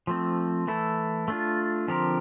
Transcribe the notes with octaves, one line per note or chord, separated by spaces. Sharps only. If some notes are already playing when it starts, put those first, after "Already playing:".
F3 A3 C4
E3 A3 E4 A4
A3 D4 F4
D3 F3 C4 G4 A#4